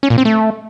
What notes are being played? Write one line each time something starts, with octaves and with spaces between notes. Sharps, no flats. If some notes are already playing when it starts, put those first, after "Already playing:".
C#4
A#2
C4
A3